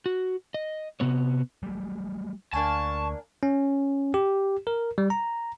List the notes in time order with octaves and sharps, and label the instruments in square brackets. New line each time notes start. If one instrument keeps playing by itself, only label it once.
[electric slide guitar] F#4
D#5
C3 B3 C#5
[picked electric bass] F#3 G3 A3
[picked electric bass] D2 [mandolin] A#3 D4 G#5 [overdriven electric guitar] A5 [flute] C#6
[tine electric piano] C#4
G4
A#4
G3
A#5